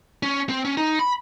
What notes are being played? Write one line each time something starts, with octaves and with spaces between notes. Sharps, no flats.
C#4
C4
C#4
D#4
B5